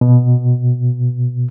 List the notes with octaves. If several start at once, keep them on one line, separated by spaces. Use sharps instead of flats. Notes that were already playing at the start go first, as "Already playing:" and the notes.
B2